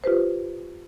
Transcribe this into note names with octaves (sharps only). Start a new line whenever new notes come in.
F4 G4 B4 C5